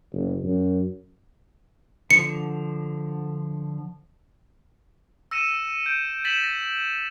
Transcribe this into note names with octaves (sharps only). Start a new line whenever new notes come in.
F#1
F#2
D3 F3 C#7
E6 A#6 C#7 D#7 E7
G6 D7
A6 B6 E7 F#7
A#6 B6